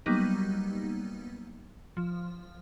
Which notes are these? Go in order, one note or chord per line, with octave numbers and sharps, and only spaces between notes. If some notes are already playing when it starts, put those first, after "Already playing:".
F#3 G3 A#3 B3 D#4
F3